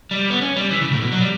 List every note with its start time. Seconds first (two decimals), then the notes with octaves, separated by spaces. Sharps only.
0.11 G3
0.30 B3
0.41 C#4
0.56 G3
0.71 E3
0.81 C#3
0.92 A2
1.02 B2
1.12 F#3
1.21 G3